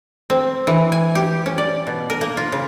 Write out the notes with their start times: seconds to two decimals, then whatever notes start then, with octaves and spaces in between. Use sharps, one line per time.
0.30 C4
0.67 E3
0.92 G#5
1.15 G4
1.46 C#4
1.58 D5
1.87 B2
2.10 A#4
2.21 A#3
2.37 F4
2.52 C#3